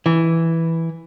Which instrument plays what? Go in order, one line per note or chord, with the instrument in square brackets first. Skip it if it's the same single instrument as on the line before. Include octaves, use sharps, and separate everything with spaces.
[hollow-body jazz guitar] E3